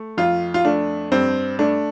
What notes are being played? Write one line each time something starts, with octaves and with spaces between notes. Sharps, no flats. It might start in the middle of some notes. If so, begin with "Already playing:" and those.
Already playing: A3
F2 F4
F4
A3 D4
G2 C4
A3 D4